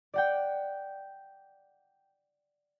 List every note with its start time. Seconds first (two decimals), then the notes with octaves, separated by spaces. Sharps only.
0.14 D5 F#5 G5